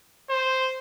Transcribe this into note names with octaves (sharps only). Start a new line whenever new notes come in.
C5